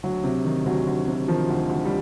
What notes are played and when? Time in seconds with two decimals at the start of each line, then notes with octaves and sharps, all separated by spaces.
0.03 D2 F#3
0.24 C3
0.45 D#3
0.66 D2 F#3
0.87 D2
1.08 C3
1.28 D#3 F3
1.49 D2
1.69 D2
1.85 G3